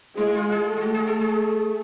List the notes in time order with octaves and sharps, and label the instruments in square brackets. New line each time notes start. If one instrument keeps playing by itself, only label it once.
[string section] G#3 [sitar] E4
[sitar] F4
G#4
[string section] A3
[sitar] F4
F#4
G#4
A4
G#4